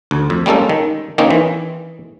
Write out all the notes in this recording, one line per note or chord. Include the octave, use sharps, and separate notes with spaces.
D2
F2
G3 G#3 A#3 C#4 A4
D#3
D#3 A#3 C4 C#4 D#4
E3